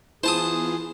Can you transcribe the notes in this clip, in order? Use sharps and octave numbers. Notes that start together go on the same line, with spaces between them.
E3 B3 E4 F4 G#4 C5 A5 D#6